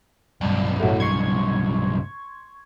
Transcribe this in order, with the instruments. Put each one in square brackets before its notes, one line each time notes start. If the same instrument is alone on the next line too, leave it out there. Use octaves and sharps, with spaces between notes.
[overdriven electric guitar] B1 G2
[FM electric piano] A2 F#3
C6 C#6 G#6